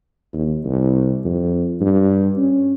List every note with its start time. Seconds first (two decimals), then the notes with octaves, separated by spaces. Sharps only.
0.33 D#2
0.65 C2
1.25 F2
1.81 G2
2.37 C#4